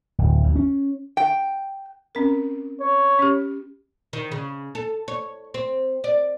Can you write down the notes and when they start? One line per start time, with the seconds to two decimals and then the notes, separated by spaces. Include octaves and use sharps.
0.18 D1
0.43 D2
0.56 C#4
1.17 G5
2.15 C4 C#4 A#4
2.81 C#5
3.19 C#4 G4
4.13 D#3
4.32 C#3
4.75 A4
5.08 C#5
5.54 C4
6.04 D5